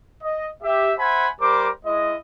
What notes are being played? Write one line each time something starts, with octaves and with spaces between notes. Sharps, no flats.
D#5
G4 E5
C5 E5 F#5 G#5 B5
G3 A#4 C5 D6
G#3 E4 D#5